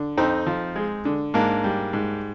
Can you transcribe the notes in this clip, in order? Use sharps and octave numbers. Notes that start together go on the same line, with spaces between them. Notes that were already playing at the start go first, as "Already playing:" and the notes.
Already playing: D3
F2 C4 D#4
F3
G#3
D3
G#2 A#3 D4
G3
G#2